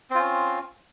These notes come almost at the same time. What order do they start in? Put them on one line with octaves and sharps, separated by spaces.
C4 F4 C#4